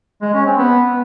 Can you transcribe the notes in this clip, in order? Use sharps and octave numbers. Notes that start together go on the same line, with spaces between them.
G#3
C#4
C4
B3